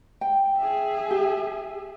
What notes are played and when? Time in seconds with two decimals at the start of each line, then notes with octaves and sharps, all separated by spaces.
0.21 G5
0.58 G#4 E5
1.11 G4